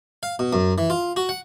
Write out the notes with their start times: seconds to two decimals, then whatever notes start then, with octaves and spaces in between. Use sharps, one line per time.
0.23 F5
0.39 B2
0.53 F#2
0.78 E3
0.90 F4
1.16 F#4
1.29 F#5